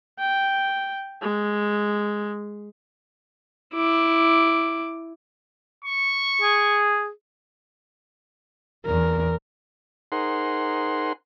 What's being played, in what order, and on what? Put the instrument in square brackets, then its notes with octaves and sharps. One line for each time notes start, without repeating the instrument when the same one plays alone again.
[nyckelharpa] G5
G#3
E4 D6
[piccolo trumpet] C#6
[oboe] G#4
[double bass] E2 [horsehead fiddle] A#4
[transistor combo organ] D#4 G#4 A#4 C5 F#5 C6